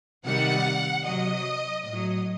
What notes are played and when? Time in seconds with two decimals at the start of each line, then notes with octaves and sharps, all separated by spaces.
0.26 C3 D#3 G3 F#5
1.05 C3 F#3 D#5
1.85 A2 F#3 D#5